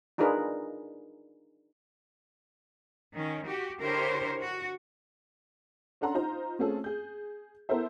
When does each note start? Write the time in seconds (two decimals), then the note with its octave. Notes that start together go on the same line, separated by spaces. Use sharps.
0.18 D4 D#4 F4 G#4 A#4 B4
3.12 D#3 C#4
3.46 F#4 G4
3.81 D3 E4 G4 A#4 C5 C#5
4.42 F#4
6.01 C#4 D4 A4 F#5 A#5 C6
6.14 D#4 F4 C5 A#5
6.59 A3 C4 C#4 F4 G#4 A4
6.84 G#4 G6
7.69 B3 E4 A4 A#4 C5 E5